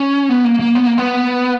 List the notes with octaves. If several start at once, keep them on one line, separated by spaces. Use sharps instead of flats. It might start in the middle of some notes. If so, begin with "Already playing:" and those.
Already playing: C#4
B3
A#3
A#3
B3
A#3
B3